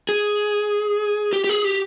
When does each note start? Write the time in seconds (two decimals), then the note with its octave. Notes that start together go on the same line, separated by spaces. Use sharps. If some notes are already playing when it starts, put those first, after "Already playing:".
0.09 G#4
1.33 G4
1.44 G4
1.49 G#4
1.64 G4